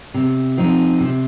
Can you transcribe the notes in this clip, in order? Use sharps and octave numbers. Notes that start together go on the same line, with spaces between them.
C3
F3 C4 D#4
C3